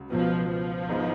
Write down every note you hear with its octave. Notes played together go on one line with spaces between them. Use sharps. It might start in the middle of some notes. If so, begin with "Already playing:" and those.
Already playing: C#2 F#3
C#2 B2 F3 F#3 B3
F3
G#1 G#2 G#3 B3